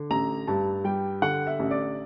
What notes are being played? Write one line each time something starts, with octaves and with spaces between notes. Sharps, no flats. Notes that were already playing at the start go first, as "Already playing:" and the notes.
Already playing: D3
A1 A#5
G2 A5
G3 G5
D3 F#5
E5
A1
D5